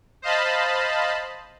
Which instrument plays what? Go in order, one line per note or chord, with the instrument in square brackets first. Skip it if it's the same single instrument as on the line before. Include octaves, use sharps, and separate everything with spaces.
[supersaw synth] C5 D#5 F5 A5 B5